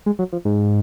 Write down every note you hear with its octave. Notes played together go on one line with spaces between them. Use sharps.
G#3
F#3
F3
G#2